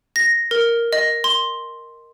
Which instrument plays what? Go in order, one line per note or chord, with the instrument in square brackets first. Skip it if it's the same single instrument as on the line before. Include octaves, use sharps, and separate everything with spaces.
[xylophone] A#6
A#4
D#5
C6